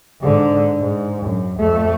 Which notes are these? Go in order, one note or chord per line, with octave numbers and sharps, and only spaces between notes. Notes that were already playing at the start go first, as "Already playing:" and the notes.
G#2 D3
G#2
F#2
F2 A3